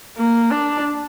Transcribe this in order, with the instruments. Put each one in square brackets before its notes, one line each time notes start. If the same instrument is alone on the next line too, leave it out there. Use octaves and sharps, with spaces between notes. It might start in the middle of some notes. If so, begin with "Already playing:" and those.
[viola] A#3
D4